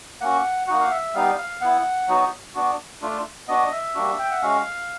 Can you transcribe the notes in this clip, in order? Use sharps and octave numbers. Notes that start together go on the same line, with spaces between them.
A#3 C#4 F#4 F#5
A#3 D#4 F#4 F#5
F5
E5
G3 B3 D#4 F5
F5
B3 E4 F#5
F#3 B3 D#4 F#4
B3 D4 F#4
A3 D4 F4
B3 D4 F#4 D#5
E5
G3 A#3 D4 F#4
G5
F#5
G#3 C#4 F#4 F5